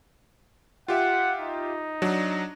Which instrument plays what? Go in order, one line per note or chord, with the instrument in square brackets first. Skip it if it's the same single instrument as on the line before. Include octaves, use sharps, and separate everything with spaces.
[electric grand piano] F4 G4 E5 [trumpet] F#5
[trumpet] D#4
[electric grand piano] F#3 D4 F#4